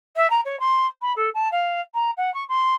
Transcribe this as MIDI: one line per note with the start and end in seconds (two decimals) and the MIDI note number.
0.16 0.29 76
0.30 0.40 82
0.45 0.59 73
0.59 0.86 84
1.02 1.12 83
1.16 1.29 69
1.34 1.48 81
1.51 1.81 77
1.94 2.11 82
2.17 2.32 78
2.34 2.44 85
2.48 2.74 84